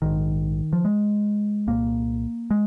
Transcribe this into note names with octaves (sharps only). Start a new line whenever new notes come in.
A#1 G#2 D#3
F3
G#3
C2 A#2 A#3
G#3